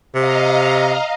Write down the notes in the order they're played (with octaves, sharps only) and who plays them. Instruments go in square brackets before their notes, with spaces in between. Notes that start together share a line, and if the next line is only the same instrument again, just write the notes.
[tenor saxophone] C3 [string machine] D#5 F5 A#5